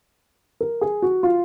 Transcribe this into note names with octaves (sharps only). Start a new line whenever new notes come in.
A#4
G#4
F#4
F4